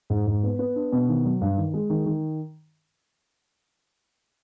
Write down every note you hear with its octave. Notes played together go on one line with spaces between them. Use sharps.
G#2
G#2
B3
B3
D4
B2
D#3
F#3
G2
D#3
G#3
D#3
D#3